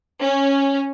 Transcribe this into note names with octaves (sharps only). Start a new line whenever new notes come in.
C#4